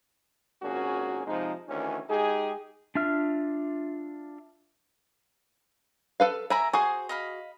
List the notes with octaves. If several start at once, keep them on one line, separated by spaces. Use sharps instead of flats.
G#1 A#2 A#3 C#4 F#4 G#4
C3 F3 G#3 D#4
D2 D#3 E3 C#4
G#3 D#4 G4 G#4
D4 F4 E5 F6
A4 B4 F5
A#4 E5 G#5 A#5 B5
F#4 G#4 C5 G#5 D#6
D#5 F5 B5